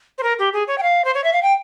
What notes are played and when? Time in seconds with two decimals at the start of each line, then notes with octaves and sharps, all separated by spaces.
0.18 C5
0.23 A#4
0.39 G4
0.53 G#4
0.67 C#5
0.78 G5
0.83 F5
1.04 C5
1.14 C#5
1.24 E5
1.33 F5
1.43 G5